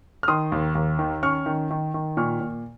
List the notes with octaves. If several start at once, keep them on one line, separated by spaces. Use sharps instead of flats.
F6
D#3 C6 D#6
D#2
D#2
D#3
C#4 C#6 F6
D#3
D#3
D#3
A#2 C#6 F6
A#2